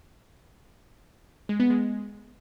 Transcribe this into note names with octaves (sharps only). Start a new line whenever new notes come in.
G#3
B3
G#3